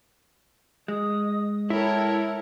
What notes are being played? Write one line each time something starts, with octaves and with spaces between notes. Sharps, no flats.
G#3 D#5 D#6
E4 A4 A#4 C#5 G5 A5